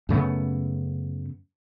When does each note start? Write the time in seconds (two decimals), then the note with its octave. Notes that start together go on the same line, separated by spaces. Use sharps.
0.09 F#2 C#3 A3 B3